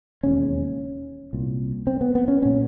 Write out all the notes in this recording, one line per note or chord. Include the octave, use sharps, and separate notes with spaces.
E1 D#2 C#3 C#4
C2 A#2
C4
B3
B3
C#4
B1 A#2 C#4